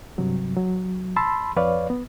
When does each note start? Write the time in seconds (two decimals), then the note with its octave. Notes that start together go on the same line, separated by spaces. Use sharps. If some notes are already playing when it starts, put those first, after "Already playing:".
0.18 G2 C3 F#3
0.56 F#3
1.16 A5 B5 C6 E6
1.56 F2 B4 C#5 D5 F5
1.90 B3